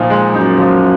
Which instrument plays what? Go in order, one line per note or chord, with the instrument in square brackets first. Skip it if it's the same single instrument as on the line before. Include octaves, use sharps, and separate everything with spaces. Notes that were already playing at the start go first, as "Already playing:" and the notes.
Already playing: [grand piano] A#2 F3 D#4
G#3
[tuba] F#2 [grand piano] D#4
[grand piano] F3